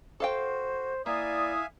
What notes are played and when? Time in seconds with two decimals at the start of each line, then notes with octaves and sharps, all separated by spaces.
0.20 F#4 A4 C5 F5 G5
1.06 A#3 E4 D5 E5 F5 G#5 D#6